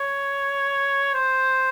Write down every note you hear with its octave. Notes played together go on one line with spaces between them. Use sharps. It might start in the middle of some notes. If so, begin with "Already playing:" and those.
Already playing: C#5
C5